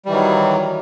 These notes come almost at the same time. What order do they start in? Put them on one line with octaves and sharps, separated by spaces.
G3 E3 D#3 F#3